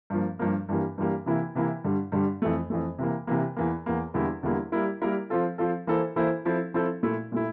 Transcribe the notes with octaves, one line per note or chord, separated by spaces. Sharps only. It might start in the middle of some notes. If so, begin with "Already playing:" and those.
G2 F3 A#3
G2 F3 A#3
G2 E3 G3 A#3
G2 E3 G3 A#3
C3 E3 A#3 E4
C3 E3 A#3 E4
G2 D3 G3
G2 D3 G3
F2 E3 A3
F2 E3 A3
C3 E3 A#3
C3 E3 A#3
E2 E3 A#3
E2 E3 A#3
E2 D3 G3 A#3 E4
E2 D3 G3 A#3 E4
G3 A#3 E4 A#4
G3 A#3 E4 A#4
F3 C4 F4 A4
F3 C4 F4 A4
E3 A#3 E4 A4 C5
E3 A#3 E4 A4 C5
F3 C4 E4 A4
F3 C4 E4 A4
A#2 A3 E4
A#2 A3 E4